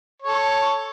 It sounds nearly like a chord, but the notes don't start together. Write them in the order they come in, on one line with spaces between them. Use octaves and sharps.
C#5 A4 C#6